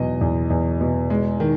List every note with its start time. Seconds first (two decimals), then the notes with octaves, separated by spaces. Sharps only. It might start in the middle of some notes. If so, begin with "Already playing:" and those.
Already playing: E2 B2 F#3 D#5
0.21 E2
0.50 E2
0.81 B2
1.10 G#3
1.40 D#3